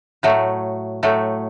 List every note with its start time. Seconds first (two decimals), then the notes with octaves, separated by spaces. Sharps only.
0.23 A2 F#3 A3
1.03 A2 F#3 A3